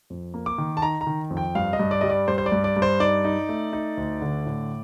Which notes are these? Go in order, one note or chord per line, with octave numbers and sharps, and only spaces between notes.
F2
A#3
D6
D#3
A5
D#4 A#5
A#5
D#3
F2
G5
G2 F5
D#5
G2
D5
G3 D#5
D5
G2 C5
C5
D5
G2
D5
G2
C5
D#4 D5
D#4
A3
D#4
D2
D3
A2